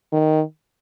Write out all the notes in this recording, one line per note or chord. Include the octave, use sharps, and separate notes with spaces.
D#3